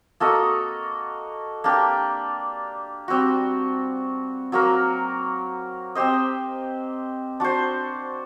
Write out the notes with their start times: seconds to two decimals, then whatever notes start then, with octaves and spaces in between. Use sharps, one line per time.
0.20 A#3 F#4 A4 D#5
1.64 A#3 D4 G4
3.08 G3 C4 F#4
4.52 F#3 A#3 F#4 A#4
5.95 C4 G4 C5 D#5
7.40 D4 F#4 C5